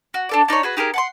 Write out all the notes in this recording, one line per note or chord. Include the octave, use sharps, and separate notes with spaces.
F#4
D4 A4 D5
D4 D#4 B4 C#5
F#4 G#4 B4
D#4 G4 G#4 A#4
F#5 A5 C6